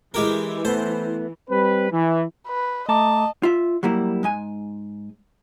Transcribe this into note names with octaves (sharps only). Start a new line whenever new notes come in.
E3 G#3 G4 A#4
A3 B3 C5
G3 C4 B4
E3
B4
A3 D#5 A5 A#5 D6
F4 E5
F#3 G3 A#3 E4
G#2 G#3 G#5